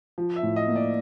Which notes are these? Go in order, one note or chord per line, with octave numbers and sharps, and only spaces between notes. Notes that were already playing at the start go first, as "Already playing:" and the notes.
F3
E5
A2
D#5
A#3
D5